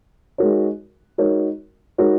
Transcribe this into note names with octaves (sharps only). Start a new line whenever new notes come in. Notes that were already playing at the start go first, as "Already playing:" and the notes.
G#3 D#4 F#4 A#4 C#5
G#3 D#4 F#4 A#4 C#5
G#3 D#4 F#4 A#4 C#5